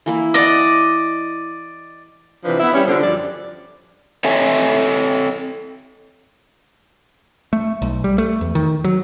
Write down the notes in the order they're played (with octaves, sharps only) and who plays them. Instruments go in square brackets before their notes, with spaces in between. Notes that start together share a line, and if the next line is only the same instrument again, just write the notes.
[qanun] E3 A#3 E4
[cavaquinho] D5 D#5 [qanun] F#5 A5
[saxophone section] C3 E3 F3 D4 B4
B3 E4
G3 C#4
D3 F3
F#2 F3 G3 D5
[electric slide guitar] C4 A4 C#5 E5 G#5
[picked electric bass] A3
B1
G3
A3
E2
D#3
F#3